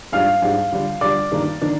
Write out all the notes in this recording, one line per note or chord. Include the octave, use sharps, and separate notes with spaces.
G#2 G3 D4 F5 F6
G#2 G3 D4
D3 G3 D4
D3 G3 D4 D5 D6
G2 D#3 A#3 D4
D#3 A#3 D4